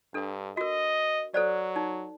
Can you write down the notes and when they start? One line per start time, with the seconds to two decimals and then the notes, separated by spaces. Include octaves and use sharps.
0.14 G2 D4 A4
0.57 F#4 A#4 D#5
1.34 F#3 A4 C5 D5
1.76 D#4